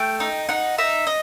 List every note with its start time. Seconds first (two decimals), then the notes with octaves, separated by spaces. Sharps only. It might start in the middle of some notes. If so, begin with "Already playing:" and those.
Already playing: A3 G5
0.20 D#4
0.49 D#4 F#5
0.78 D#4 E5
1.07 D#5